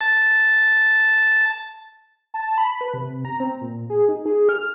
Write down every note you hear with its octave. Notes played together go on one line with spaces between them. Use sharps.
A5
A5
B5
B4
C3
A#5
C4
A#2
G#4
D#4
G#4
F6